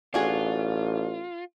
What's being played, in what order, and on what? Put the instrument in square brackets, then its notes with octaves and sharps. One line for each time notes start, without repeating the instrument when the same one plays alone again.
[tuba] A1 [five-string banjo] D4 F#4 G#4 [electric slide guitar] F4